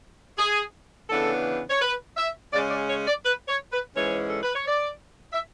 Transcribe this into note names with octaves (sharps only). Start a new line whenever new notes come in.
G#4
C#3 E3 B3 D4 A4
C#5
B4
E5
C#3 G#3 C#4 D5
D5
C#5
D5
B4
C#5
B4
G#2 E3 G#3 C#4 C#5
A4
B4
C#5
D5
E5